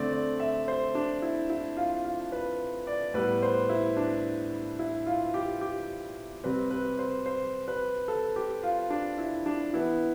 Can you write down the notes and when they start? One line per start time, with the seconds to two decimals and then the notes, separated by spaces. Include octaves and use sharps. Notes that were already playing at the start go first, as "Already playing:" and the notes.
Already playing: D3 A3 C4 D5
0.12 D5
0.40 E5
0.68 C5
0.95 D4
1.22 E4
1.50 E4
1.77 F4
2.04 F4
2.32 B4
2.87 D5
3.14 A2 G3 B3 B4
3.42 C5
3.69 E4
3.97 D4
4.79 E4
5.06 F4
5.34 G4
5.61 G4
6.44 C3 G3 C4 B4
6.71 B4
6.99 C5
7.26 C5
7.68 B4
8.08 A4
8.36 G4
8.63 F4
8.90 D4
9.18 E4
9.46 D4
9.74 E3 B3 E4